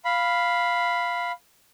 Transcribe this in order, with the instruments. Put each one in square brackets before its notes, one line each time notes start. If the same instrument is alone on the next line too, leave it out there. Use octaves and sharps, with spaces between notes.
[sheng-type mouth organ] F5 B5